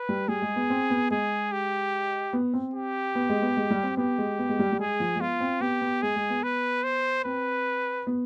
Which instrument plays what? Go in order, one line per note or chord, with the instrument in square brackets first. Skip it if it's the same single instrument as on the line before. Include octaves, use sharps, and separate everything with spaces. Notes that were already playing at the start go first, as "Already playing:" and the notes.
Already playing: [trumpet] B4
[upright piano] G3
[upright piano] G3 [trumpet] G#4
[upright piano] G#3
B3
C4
B3
[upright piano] G#3 [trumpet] G#4
[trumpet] G4
[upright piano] B3
C4
[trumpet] G4
[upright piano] B3
G#3
B3
G#3
G3
C4
[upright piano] B3 [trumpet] G4
[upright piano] G#3
B3
G#3
G3
G3
[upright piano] G#3 [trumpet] G#4
[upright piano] F3
G#3
[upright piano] B3 [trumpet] F4
[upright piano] C4
[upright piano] B3 [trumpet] G4
[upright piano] B3
[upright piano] G#3 [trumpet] G#4
[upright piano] G#3
B3
[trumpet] B4
C5
[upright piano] C4 [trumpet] B4
[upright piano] B3